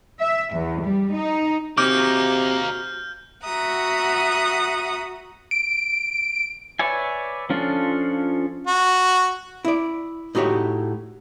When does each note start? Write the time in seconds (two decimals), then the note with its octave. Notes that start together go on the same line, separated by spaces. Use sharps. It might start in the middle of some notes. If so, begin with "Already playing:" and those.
0.18 E5
0.55 E2
0.83 G3
1.14 D#4
1.78 C3 A#3 D#4 F#4 G#4 D6 F6 G6
3.44 F#4 E5 F#5 A#5 D#6
5.51 D7
6.79 B4 C#5 D5 E5 G#5
7.50 F3 C#4 D4 F4 A4
8.67 F#4
9.65 E4 D5
10.35 A2 D#4 F#4 G4 C#5